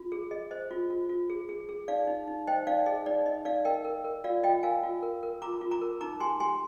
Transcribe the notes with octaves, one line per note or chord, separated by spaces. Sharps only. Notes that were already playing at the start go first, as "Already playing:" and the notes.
Already playing: F4
G#4
G#4 D#5
C5 D#5
F4
F4
F4
G#4
G#4
G#4
D#4 D5 F5
D#4
D#4
C5 D#5 G5
D#4 D5 F5
G#4 D#5
D#4 D5
D#4 D#5
D#4 D5 F5
A#4 D#5 G5
A#4
A#4
F4 D5 F5
F4 D#5 G5
A#4 F5 G#5
F4
A#4
A#4
F4 A#5 D6
F4
A#5 D6
A#4
D#4 A#5 D6
G4 G#5 C6
G4 G#5 C6